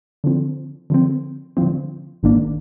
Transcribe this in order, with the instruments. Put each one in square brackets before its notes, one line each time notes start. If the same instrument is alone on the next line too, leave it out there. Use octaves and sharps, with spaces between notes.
[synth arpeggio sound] D3 F3 C4
D3 F3 C4
D3 F3 C4
A#1 G#2 D#3 A#3 D4